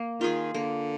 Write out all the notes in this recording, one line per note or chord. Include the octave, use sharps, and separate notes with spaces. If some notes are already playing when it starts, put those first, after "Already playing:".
Already playing: A#3
D#3 F4 G#4
D3 A#3